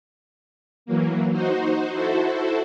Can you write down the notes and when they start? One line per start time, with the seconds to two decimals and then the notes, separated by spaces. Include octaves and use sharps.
0.86 E3 F#3 A#3
1.32 D#4 F#4 C5
1.93 E4 F#4 A4 C5